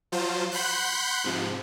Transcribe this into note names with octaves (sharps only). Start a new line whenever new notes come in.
F3 F#3 F4 C5
F#5 B5 C6 F#6 G6
G#2 C3 F3